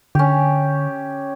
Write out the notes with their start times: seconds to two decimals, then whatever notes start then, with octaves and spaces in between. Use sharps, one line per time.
0.15 D3 C#4 G4